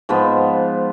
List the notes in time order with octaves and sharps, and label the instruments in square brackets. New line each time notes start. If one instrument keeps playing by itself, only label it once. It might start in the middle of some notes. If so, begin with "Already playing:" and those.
[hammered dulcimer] G#2 F3 B3